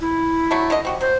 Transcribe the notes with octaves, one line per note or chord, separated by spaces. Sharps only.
E4
F#3 A3 D4
D3 D4 D#5
C4 F#4 G4
F#3 C5